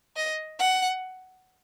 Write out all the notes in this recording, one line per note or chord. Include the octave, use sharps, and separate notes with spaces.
D#5
F#5